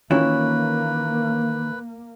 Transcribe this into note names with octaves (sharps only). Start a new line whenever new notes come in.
D#3 E3 A#3 C#4 E4 F4 B4